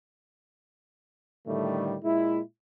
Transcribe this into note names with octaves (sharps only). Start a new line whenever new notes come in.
A2 D3 D#3 G3 A3
A#2 G#3 E4